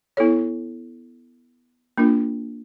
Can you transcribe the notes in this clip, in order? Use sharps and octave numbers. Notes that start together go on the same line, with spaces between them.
B3 E4 A4 C#5
A#3 D4 F4 A#4